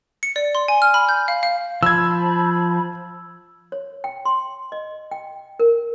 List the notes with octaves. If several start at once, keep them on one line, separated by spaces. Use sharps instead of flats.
C#7
D5
C6
G#5
F6
B5
G6
F5
F5
F3 C5 A5 B5 E6 G#6
C#5
G5
C6
D#5
G5
A#4